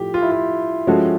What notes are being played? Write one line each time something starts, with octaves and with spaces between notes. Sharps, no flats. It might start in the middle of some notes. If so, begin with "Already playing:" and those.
Already playing: A2 F3 G4
F4
E4
F4
F3 G#3 C#4 F#4 A4